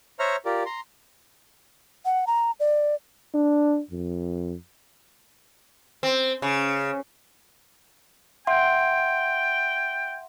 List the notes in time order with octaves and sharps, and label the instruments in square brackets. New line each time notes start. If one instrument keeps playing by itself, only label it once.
[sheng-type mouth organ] C5 C#5 E5 A#5 F6
F4 G4 A#4 D5
A#5 C6
[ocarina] F#5
A#5
D5
[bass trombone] D4
F2
[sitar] C4
C#3
[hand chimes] E5 F#5 C6 [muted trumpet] G5